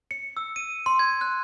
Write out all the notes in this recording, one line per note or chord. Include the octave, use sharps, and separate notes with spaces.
C#7
E6
D#7
C6
G#6
F#6